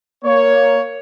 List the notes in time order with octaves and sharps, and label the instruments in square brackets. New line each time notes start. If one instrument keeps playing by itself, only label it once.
[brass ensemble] A#3 C#5